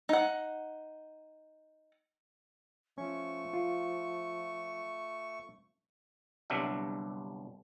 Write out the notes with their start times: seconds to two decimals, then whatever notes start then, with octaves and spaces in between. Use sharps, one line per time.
0.09 D#4 F#5
2.98 F3 A3 C#4 C#6
3.54 F4
6.50 G1 C2 G2 F#3 D4 E5